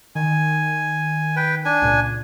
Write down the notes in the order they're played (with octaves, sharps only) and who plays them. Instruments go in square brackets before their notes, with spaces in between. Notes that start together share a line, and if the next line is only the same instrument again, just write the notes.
[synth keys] D#3 [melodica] G#5
[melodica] B4 G5
D4 G#5
[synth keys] C#2 A#2